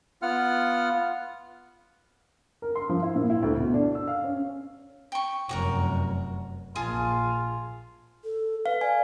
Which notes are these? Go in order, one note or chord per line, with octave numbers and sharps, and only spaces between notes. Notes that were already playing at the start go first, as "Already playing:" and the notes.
B3 F4 F#5 F6
A#4
C6
F3
E4
A#2
E4
D2
B2
D4
E6
F5
C#4
G5 C#6
F1 F#2 F#4 G4 A#4
A#1 F4 G#4 A5
A4
B4 F5
D5 G#5